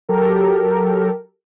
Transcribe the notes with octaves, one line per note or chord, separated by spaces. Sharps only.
F#3 G4 A4 A#4